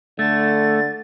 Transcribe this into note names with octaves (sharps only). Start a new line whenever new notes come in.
D3 A3 A6